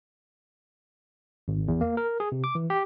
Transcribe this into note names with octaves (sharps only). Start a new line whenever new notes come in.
G#1
E2
A#3
A#4
G#4
C3
D6
E3
G4